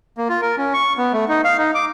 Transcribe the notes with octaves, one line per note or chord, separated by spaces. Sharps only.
A#3
F4
A#4
C#4
C#6
B3
A3
D#4
F5
D#4
D6